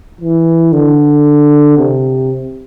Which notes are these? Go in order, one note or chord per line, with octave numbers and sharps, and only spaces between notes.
E3
D3
C3